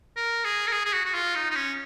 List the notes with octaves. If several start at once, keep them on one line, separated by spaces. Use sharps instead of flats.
A#4
G#4
A#4
G#4
G#4
F#4
F#4
F4
D#4
D#4
C#4